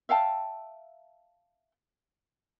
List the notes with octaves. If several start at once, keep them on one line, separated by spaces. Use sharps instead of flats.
E5 F5 G5 A5